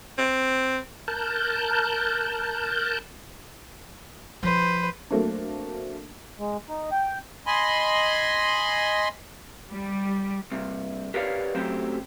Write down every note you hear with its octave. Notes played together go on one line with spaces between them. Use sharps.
C4
A#4 A5 F#6 G6
F3 B4 C5
F#3 A3 A#3 C4 D4
G#3
D#4
G5
D#5 G#5 B5 C6
G3
G2 C3
G4 A#4 B4 C#5 D5 F5
F#2 F#3 A3 C4 G4